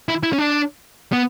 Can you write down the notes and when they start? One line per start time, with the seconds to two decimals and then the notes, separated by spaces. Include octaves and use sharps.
0.09 E4
0.23 E4
0.33 C#4
0.38 D4
1.13 B3